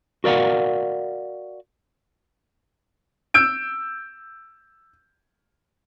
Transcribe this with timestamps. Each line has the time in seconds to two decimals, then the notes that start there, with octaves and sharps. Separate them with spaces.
0.24 F#4 A#4 D5 F5 F#5
3.34 E6 G6 D7